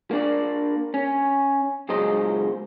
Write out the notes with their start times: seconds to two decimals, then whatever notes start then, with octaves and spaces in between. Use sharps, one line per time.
0.11 A#3 D4 D5
0.94 C#4
1.89 C#2 A#2 F#3 G#3 C5 D#5